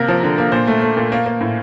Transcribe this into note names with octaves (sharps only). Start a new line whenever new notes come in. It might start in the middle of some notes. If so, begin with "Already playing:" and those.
Already playing: C3 A#3 A#4
F3
D3
A#3
A#2 C5
A3
A3
A#2
A#3
A#3
A2